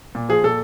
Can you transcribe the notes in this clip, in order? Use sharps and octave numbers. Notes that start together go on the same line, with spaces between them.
A#2
F3 G#4
A#2 A4